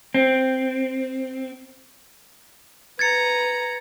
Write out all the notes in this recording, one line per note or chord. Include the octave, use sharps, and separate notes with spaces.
C4
B4 A#5 G#6 A6 C#7